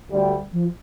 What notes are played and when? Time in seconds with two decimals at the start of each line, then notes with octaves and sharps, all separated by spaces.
0.11 D2 D3 G3
0.52 F3